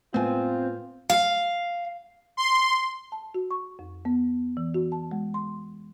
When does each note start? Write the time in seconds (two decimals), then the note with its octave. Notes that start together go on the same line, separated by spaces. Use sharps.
0.14 A2 G#3 A3 B3 C4 F4 G#5
1.10 F5
2.37 C6
3.12 A5
3.34 F#4
3.51 C#6
3.79 F2
4.05 B3
4.57 E3
4.74 F#4
4.92 A5
5.11 G#3
5.34 C6